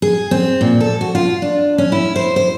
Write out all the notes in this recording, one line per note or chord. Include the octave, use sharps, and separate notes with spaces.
G#4
C4
A#2
A4
F#4
F4
D4
C#4
E4
C5
C5